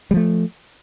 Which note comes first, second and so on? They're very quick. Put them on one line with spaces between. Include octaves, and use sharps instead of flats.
G3 F3 A3